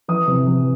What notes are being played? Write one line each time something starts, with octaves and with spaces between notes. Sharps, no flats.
E3 D#6
C3
E3